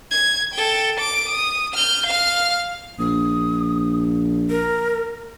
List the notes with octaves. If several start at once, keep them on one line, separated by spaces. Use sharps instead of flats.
G#6
A4 G5
D6 D7
D#6
F6 G6
F5 F6
A#1 D#6
A#4